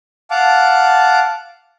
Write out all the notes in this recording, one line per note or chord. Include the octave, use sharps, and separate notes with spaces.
F5 F#5 A5 D6